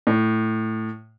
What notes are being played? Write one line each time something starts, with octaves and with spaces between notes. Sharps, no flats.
A2